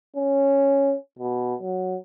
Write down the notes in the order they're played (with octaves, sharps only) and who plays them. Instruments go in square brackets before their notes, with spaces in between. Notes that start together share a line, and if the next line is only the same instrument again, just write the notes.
[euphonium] C#4
B2
F#3